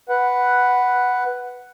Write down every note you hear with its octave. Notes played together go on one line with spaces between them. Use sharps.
B4 F#5